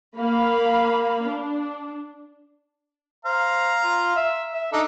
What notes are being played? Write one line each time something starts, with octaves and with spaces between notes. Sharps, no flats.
A#3 F5 B5
D4
C5 F5 A#5
F4
E5
E5
D4 D#4 A4